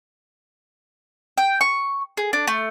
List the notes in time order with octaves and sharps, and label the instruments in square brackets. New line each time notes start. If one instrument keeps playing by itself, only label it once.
[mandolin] G5
C#6
G#4
D4
A3